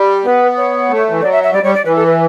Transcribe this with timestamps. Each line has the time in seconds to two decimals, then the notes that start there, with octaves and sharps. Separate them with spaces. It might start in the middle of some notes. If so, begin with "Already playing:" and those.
Already playing: G3
0.25 B3 B4
0.57 C#5
0.90 A3
1.09 E3
1.20 F#3 D5
1.32 E5
1.43 E5
1.53 G3 D5
1.63 G3 C#5
1.74 D5
1.85 E3 B4
1.96 A4
2.06 B4